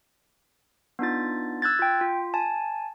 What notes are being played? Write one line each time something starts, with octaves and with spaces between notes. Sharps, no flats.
B3 D4 D#4 F4 A6
E6 F#6 G#6 A6
F4 G5
F4
G#5 A5